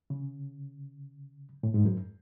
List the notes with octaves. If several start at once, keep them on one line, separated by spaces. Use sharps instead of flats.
C#3
A2
G#2
F#2